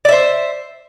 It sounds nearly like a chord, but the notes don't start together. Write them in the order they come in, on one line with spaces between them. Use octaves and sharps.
D5 E5 C5